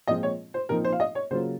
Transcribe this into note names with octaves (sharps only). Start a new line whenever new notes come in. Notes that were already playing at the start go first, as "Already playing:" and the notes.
A#2 F3 G#3 C4 F4 D#5
C#5
C5
A#2 F3 C4 D#4 A#4
C5
F5
D#5
C#5
C#3 F#3 A#3 F4 C5